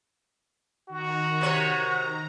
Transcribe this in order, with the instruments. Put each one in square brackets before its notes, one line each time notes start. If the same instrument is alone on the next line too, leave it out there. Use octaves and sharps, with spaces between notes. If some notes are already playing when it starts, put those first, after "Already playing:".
[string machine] D#3 A#5 [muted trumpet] F#4
[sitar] C3 C#5